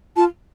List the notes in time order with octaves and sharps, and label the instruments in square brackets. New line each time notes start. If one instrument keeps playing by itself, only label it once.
[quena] F4 [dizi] A5